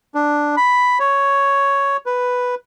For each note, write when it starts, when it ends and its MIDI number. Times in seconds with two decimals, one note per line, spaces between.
0.15 0.56 62
0.57 0.99 83
1.00 1.97 73
2.06 2.55 71